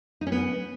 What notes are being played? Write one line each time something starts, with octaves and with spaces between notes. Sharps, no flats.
D#4
C#4
B3